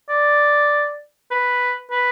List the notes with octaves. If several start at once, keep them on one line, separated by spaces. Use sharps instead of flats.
D5
B4
B4